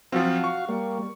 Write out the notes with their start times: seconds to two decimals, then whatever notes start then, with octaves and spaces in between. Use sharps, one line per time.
0.12 F3 F#3 C4 F#4 F5
0.44 C#6
0.69 G3 A#3